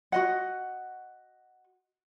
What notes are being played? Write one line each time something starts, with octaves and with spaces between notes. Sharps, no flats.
F#4 D#5 F#5